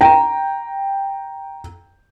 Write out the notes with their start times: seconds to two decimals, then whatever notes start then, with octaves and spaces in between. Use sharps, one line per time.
0.01 G5 A#5